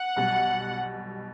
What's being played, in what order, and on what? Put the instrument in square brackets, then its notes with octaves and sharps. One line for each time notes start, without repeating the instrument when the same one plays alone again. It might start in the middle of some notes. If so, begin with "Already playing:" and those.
Already playing: [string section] F#5
[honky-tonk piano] B1 B2 G3